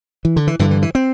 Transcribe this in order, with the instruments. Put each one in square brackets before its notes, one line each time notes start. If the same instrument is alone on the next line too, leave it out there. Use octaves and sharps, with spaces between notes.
[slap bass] E3
D3
E3
G2 D3 E3
E3
E3
C4